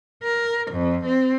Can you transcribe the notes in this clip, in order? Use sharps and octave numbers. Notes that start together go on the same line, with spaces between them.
A#4
F2
C4